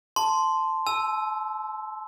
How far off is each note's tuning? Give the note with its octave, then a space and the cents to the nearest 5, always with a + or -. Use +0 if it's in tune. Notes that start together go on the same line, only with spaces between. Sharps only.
A5 +0 C6 -5
A5 -45 E6 -5